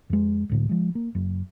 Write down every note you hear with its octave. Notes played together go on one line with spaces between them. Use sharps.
F2 G#3
C#2 A2 D3
F3 G#3
A#3
F#1 F#2